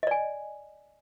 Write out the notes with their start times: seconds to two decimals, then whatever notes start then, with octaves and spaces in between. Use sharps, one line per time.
0.03 D#5
0.07 D5
0.11 G#5